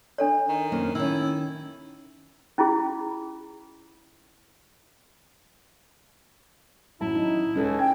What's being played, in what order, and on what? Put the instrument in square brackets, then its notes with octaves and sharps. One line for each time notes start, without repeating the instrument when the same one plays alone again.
[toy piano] D4 A4 C#5
[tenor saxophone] D#3
[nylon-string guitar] F#2 A#3 C4
[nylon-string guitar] D#3 C#4 [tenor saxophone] E4
[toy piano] C#4 E4 F4 G#4
[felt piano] A1 F#3 A5 [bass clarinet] E4
[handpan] D#4
[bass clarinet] C#2 [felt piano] G#3 [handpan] C#4 A4
[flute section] G5 [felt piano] G#6